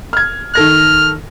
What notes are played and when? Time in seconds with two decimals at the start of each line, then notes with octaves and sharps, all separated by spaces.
0.13 F6 G#6
0.55 D#3 A4 F6 A#6